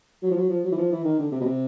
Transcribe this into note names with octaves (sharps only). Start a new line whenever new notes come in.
F#3
F3
F#3
F3
F#3
E3
F3
E3
D#3
D3
C3
B2
C3